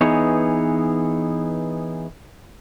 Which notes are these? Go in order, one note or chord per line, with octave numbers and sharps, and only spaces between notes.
E3 B3 D#4 G#4 C#5